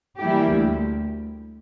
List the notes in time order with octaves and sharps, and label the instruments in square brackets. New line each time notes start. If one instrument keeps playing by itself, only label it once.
[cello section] E3 G3 A#3 E4 G4
D2